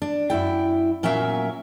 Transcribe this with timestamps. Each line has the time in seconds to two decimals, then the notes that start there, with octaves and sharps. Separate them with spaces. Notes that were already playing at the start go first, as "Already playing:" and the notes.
0.02 D4
0.30 F#2 E4 G5
1.03 A#2 F#3 C#4 A#4 E5 F5